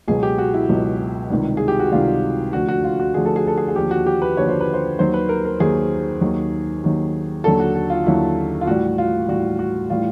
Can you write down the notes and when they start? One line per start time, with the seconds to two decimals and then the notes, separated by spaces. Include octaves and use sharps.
0.08 C#2 B2 F#3 G#4
0.23 G4
0.38 F#4
0.54 E4
0.69 C#2 B2 F#3
1.30 C#2 C3 D#3 G3
1.57 G#4
1.68 G4
1.79 F#4
1.92 C#2 C3 D#3 G3 F4
2.53 D2 D3 F3 F#4
2.68 F#4
2.84 F4
3.00 F#4
3.14 D2 D3 F3 G#4
3.25 A4
3.36 G#4
3.47 A4
3.57 G#4
3.68 G#4
3.76 D#2 D3 F3 G4
3.91 F#4
4.06 G4
4.22 B4
4.37 D#2 D3 F3 C#5
4.49 C5
4.61 B4
4.73 C5
4.99 D#2 D#3 F#3 C5
5.14 B4
5.29 A#4
5.45 A#4
5.60 D#2 D#3 F#3 G#4
6.21 D#2 D#3 F#3
6.84 D#2 D#3 F#3
7.44 D#2 D3 F#3 A4
7.60 F#4
7.75 F#4
7.90 F4
8.06 D#2 D3 F#3 E4
8.61 F4
8.67 A2 E3 G3 F#4
8.98 F4
9.28 A2 E3 G3 F#4
9.59 F#4
9.90 A2 E3 G3 F4